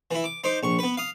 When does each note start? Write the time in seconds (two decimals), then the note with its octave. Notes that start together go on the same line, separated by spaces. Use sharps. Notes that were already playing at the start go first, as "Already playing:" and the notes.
0.11 E3 E4
0.24 D6
0.44 D#4 C5 D6
0.63 A#1 C#6
0.79 B3 B4
0.97 F5 D#6